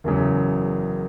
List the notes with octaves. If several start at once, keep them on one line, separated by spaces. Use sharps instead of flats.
F#1 E2 C#3 F#3